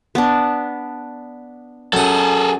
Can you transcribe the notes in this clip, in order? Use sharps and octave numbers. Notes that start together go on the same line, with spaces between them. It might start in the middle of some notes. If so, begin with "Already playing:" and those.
B3 D4
F#2 G#4 A4 F#5